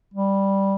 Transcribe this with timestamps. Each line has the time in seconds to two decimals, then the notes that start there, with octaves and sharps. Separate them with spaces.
0.14 G3